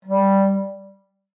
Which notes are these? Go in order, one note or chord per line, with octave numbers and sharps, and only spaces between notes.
G3